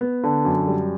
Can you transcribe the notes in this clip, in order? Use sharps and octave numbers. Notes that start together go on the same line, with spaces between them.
B3
D3
F#2
G3